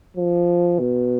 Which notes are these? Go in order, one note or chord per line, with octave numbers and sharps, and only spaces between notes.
F3
B2